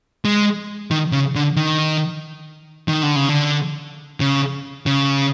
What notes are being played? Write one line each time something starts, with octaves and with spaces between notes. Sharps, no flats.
G#3
D#3
C#3
D3
D#3
D#3
D3
C#3
D3
C#3
C#3